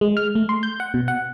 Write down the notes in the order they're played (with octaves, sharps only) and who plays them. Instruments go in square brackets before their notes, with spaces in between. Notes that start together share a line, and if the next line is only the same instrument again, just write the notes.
[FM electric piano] G#3
F6
A3
C6
G6
F#5
B2
F#5